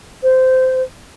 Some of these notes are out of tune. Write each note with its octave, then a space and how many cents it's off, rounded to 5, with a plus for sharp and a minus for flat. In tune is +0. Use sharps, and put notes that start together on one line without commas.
C5 -15